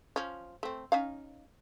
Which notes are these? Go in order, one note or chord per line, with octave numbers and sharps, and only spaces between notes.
F3 C#4
A3 C4
C#4 D#4 F5